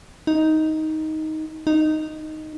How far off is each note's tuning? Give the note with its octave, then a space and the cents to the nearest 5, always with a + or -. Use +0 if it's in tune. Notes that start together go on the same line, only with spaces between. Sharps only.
D#4 +10
D#4 -5